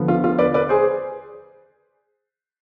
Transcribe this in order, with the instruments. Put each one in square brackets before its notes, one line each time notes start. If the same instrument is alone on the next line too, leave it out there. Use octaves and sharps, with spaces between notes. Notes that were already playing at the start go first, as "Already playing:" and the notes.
Already playing: [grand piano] D3 F3 B3
F4
F4
B4 D5
B4 D5
G#4 C5